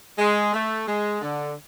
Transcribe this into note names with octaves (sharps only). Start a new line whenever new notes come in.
G#3
A3
G#3
D3